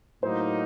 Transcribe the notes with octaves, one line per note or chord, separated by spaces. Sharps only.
A2 F#3 A#3 D#4 C5